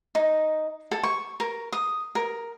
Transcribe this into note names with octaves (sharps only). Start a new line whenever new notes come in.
D#4
A4
C#6
A#4
D#6
A#4